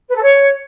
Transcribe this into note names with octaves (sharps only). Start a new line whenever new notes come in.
B4
A4
C#5